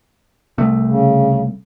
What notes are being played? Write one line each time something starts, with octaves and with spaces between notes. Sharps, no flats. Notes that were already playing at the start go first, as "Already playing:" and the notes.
C2 A3
C#3